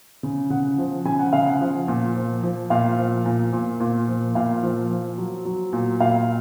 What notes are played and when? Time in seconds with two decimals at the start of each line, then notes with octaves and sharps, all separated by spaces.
0.23 C#3
0.50 C#3 F#5
0.78 F3
1.05 C#3 G#5
1.19 F#5
1.33 C#3 F5
1.46 F#5
1.60 F3
1.88 A#2
2.16 F3
2.43 F3
2.70 A#2 F5
2.98 F3
3.26 A#2
3.53 A#2
3.80 A#2
4.08 F3
4.35 A#2 F5
4.63 F3
4.90 F3
5.18 F#3
5.45 F#3
5.73 A#2
6.00 A#2 F5